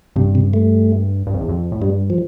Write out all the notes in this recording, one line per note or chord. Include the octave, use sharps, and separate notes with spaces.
G2 C3
C3
A3
G2
F2
E2
F2
A2
G2 G3
F3